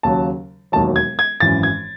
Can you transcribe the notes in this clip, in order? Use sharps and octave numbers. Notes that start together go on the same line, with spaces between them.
D#2 C#3 F#3 A5
E1 D#2 D#3 F#3 A5
G#6
G#6
G#1 F#2 E3 A6
G#6